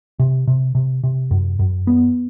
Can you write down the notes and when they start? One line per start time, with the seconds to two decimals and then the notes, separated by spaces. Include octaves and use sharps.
0.19 C3
0.48 C3
0.75 C3
1.04 C3
1.31 F#2
1.59 F#2
1.87 B3